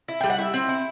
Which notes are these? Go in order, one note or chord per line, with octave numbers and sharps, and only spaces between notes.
E4
G3 G5
F#5
E4 E5
C4
E4